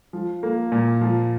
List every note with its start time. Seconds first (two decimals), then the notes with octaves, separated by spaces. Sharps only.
0.13 F3
0.43 A#3
0.72 A#2
1.01 F3